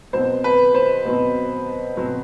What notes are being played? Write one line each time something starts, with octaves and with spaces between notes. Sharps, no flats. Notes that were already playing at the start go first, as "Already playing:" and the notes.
B2 F#3 C4 C5
B4
C5
B2 F#3 C4
B2 F#3 C4